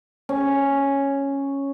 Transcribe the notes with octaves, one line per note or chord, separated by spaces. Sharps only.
C#4